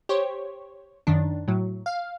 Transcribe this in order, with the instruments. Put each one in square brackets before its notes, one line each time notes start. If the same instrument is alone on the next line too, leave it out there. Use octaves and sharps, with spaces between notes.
[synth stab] G4 C5 C#5
F#2 D#3 D4
A2 F#3
F5